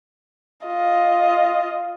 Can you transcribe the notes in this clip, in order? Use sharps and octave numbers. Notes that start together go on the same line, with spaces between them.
F4 D#5